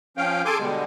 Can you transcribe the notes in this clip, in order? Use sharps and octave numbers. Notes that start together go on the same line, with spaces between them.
F3 C#4 F5 G5
G#4 A4 G#5 C6 D6
B2 D3 G3 G#3